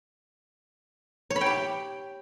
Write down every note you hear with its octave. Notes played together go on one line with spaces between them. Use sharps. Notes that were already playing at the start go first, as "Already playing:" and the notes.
C#5
B5
G5
G4